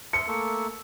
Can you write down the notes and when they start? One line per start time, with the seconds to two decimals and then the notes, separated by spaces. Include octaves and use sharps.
0.13 E5 C6 C#7
0.27 A3 A#3 E5